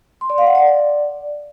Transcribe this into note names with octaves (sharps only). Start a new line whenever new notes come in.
C6
D5
F5
F#5
D5